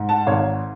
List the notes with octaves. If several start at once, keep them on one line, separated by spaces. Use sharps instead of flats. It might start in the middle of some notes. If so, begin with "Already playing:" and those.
Already playing: G#2
F#5 A5
G#1 C#5 F5